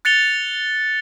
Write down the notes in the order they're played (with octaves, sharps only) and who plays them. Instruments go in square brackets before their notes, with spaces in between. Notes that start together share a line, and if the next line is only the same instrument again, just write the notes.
[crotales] F#6 A6 C#7 F7 G7